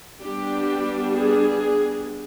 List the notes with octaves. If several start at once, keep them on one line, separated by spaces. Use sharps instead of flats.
G3 B3 D4 G4
G#4